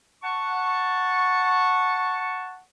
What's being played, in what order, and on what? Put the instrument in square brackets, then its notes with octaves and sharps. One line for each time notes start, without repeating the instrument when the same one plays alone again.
[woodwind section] F#5 A5 C#6